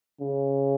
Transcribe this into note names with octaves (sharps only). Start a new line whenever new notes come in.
C#3